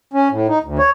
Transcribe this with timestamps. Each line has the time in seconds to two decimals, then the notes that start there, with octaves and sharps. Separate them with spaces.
0.14 C#4
0.31 A2
0.48 D#4
0.64 D2
0.79 C#5